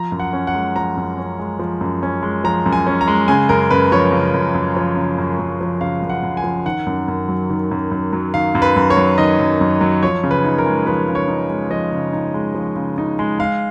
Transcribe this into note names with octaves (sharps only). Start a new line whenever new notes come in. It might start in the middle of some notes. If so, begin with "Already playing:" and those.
Already playing: F3 A#5
F#2
F#5
C#4
F#5
G#3
F3 A#5
F#2
C#4
G#3
F3
F#2
C#4
G#3
F3 A#5
F#2
G#5
C#4
A#5
G#3
C#3 G#5
F#2 A#4
F#2 B4
F3 C#5
C#3
F#2
F#2
F3
C#3
F#2
F#2
F3
C#3 F5
F#2
F#5
F#2
G#5
F3
D#3 F#5
F#2
F#2
F#3
D#3
F#2
F#2
F#3
D#3 F5
F#2
B4
F#2
C#5
F#3
D#3 D#5
F#2
F#2
F#3
F3 C#5
C#3
B4
D#4
A#4
G#3
F3 B4
C#3
C#5
D#4
G#3
F3 D#5
C#3
D#4
G#3
F3
C#3
D#4
G#3
G#3 F5